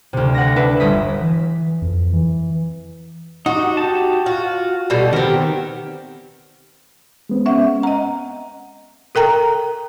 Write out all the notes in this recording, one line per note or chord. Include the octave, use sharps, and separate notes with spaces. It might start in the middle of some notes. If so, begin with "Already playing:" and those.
D2 C3
F#5 A#6
D4 B4 E5
G1 D#6 B6
E3
F2
E3
D#4 F#4 G4
G4 A5
F4 F#4
B2 G3 A4
D#3 B3 C4 G4 A#4
G#3 B3 C4
C#4 E5 F#5
D#5 F#5 A#5
A4 A#4 G5 A#5